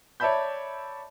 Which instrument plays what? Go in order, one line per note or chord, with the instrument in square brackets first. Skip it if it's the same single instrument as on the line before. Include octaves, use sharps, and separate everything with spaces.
[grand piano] C#5 D5 E5 A5 B5 G6